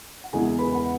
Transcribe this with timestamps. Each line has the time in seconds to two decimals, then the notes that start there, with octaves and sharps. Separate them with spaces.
0.24 F#5
0.33 E2 C#3 G#3 E4 G#4 G#5
0.58 B4 B5
0.74 F#5